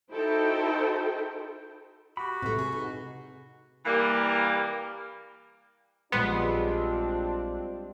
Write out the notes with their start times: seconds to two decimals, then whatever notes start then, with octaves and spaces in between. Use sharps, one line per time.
0.12 D#4 E4 F#4 A4 C5 G5
2.17 F#4 G4 B5
2.42 A2 C3 A3 B4
2.59 G#4
2.72 D#4
3.85 E3 G3 A#3
6.12 A#1 G3 G#3 B3 C4 D4 F4 C6